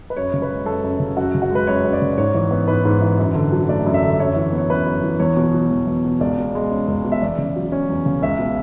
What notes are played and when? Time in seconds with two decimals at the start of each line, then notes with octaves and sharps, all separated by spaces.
0.10 B4
0.17 F#2 C#5
0.34 C#3
0.42 B4
0.50 G#3
0.66 F#2 A4
0.84 F#2
1.00 C#3
1.16 F#2 F#4
1.34 C#3
1.42 F#4
1.51 G#3 B4
1.67 F#2 C#5
1.84 F#2
1.93 D5
2.02 C#3
2.17 G#2 C#5
2.34 E3
2.51 B3
2.68 G#2 B4
2.85 G#2
3.02 E3
3.19 F#2
3.35 D3
3.52 F#3
3.69 A3 D5
3.86 F#2
3.94 E5
4.02 D3
4.19 F#2 C#5
4.36 E3
4.52 B3
4.58 C#5
4.70 F#2 B4
4.86 F#2
5.03 E3
5.20 E2 C#5
5.37 B2
5.54 F#3
5.71 E2
5.87 E2
6.05 B2
6.21 C#2 D5
6.38 B2
6.55 G#3
6.71 C#4
6.88 C#2
7.04 B2
7.12 E5
7.22 E2 D5
7.38 C#3
7.56 F#3
7.72 C#4
7.89 E2
8.06 C#3
8.22 C#2 E5
8.39 B2